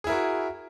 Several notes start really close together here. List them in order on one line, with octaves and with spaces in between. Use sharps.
G#4 E4 A#4 F#4